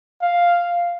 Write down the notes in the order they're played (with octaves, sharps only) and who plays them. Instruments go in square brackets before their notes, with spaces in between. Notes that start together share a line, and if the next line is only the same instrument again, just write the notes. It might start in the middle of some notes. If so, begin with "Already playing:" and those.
[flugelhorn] F5